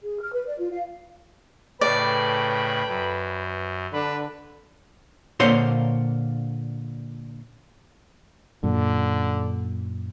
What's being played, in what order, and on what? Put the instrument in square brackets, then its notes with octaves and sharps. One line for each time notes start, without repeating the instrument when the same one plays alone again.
[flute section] G#4
F6
B4
D5
F4
F5
[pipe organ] A2 C#3 [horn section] A4 G5 B5 [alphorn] B4 [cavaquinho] D5
[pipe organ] F#2
[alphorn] D3 [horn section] D4 B4
[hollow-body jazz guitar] A#2 D3 A#3 C5 C#5 C6
[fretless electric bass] F#2 A#2 [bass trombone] D3